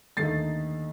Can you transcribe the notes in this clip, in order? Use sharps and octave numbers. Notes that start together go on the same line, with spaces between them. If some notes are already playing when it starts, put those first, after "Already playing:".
D#2 D3 A3 D#4 A6 C7